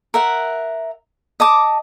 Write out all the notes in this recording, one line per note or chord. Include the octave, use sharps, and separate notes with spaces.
A#4 E5 F#5
D#5 A5 D6